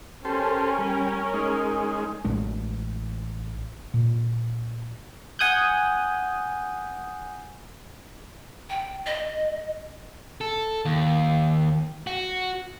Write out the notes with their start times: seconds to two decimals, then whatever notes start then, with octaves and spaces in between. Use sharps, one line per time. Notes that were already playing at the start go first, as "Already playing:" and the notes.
0.25 C#4 G4 A4 A#4 C5
0.79 G3
1.33 G#3 D#4
2.25 A1 G#3 D4
3.94 A#2
5.39 F#5 G#5 D#6 F#6 G6
8.69 G5
9.06 D#5
10.41 A4
10.85 D#2
12.07 F#4